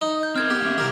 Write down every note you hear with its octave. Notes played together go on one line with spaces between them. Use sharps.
D#4
G6
C4 A#4 F6 G#6
B3 G4
A#3 C#4 E5
C3 F3 G3 G4 A#4